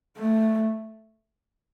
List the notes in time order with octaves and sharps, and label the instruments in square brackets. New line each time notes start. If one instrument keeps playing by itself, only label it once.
[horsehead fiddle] A3